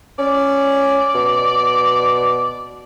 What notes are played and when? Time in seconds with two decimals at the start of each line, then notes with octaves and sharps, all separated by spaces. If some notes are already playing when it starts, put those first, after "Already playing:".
0.18 C#4 D5
1.14 B2